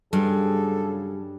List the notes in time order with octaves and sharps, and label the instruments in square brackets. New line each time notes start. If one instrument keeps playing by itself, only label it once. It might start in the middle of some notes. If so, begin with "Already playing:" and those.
[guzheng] G2 [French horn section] C#3 F#3 G#4 [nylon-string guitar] G3 [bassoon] A4